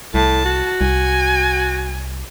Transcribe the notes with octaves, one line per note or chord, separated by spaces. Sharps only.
C2 A2 A5
F#4
C2 G#5